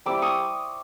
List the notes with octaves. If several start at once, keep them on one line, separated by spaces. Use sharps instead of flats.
G3 C4 E4 D6 E6
C#6 D#6